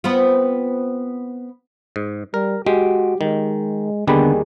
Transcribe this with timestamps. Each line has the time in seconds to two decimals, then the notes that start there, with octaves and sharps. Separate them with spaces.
0.04 B3 C4 F4
1.96 G#2
2.34 G3 A#4
2.66 G#3 F#4 G4
3.21 D#3 G#3
4.07 D#2 D3 D#3 G3 B3 G#4 B5